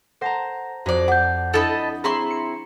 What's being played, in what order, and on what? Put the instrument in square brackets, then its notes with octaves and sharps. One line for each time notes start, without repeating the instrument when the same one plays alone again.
[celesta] A4 F#5 A#6 [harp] C5 A5 A#5
[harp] F2 [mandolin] D#4 D5 [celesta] F#4 C5
[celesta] F#5 G6 [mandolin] D6
[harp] D4 E4 [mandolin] A4 D#5 B5
[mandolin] C4 E4 C6 [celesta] G#4 A#5 [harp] C#6
[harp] C#7